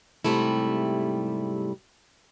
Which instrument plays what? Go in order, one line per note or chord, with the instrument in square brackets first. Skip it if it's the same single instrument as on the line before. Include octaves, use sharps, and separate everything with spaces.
[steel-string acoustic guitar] G#2 C3 G3 A3 E4